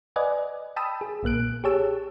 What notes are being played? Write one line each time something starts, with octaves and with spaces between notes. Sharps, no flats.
B4 D5 D#5 F#5 G#5
G5 A5 B5 D#6 E6
G#4
B1 A#2 A#3 F#6 D7
G4 G#4 C#5 A5 E6